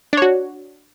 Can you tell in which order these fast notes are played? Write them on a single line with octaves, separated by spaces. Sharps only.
D4 C#5 F#4